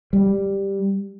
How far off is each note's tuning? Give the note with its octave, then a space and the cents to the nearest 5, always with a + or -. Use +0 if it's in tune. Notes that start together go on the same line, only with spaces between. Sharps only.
G3 +5